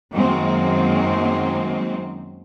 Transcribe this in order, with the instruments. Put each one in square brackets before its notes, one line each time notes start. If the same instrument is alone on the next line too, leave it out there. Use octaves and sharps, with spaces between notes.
[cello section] F#2 D#3 G#3 A#3 C4